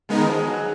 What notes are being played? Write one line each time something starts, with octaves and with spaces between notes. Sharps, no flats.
C#3 G#3 B3 D#4 A#4
D#3
F3
G#3
F#3